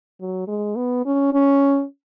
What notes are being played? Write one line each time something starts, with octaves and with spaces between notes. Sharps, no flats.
F#3
G#3
B3
C#4
C#4